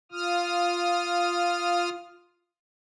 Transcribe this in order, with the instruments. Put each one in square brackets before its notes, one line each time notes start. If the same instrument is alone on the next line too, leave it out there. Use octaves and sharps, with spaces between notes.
[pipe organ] F4 D#6 F6